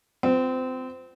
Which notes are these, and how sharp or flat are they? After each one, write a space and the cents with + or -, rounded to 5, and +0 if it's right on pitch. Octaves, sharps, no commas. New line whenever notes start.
C4 -25 F4 +10